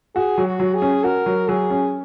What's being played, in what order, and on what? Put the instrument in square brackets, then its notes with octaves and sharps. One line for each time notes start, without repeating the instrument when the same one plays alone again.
[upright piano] F#4 [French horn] G#4
[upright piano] F#3
[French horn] F#4
[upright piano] F#3
[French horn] G#4
[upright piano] C#4
[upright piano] F#4 [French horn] A#4
[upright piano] F#3
[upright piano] F#3 [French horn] G#4
[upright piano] C#4